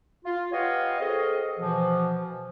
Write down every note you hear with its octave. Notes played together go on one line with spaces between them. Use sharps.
F4
G4 B4 C#5 D#5 F5 F#5
C4 G#4 A4 D#5
B2 E3 F3